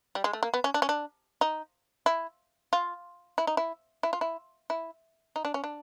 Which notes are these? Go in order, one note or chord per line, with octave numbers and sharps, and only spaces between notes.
G3
G#3
A3
A#3
B3
C#4
D4
C#4
D4
D#4
E4
F4
E4
D#4
E4
E4
F4
E4
E4
D#4
D4
C#4
D4